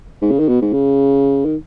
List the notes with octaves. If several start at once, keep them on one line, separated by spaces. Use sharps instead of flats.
G#2
C#3
D#3
B2
G#2
C#3
D#3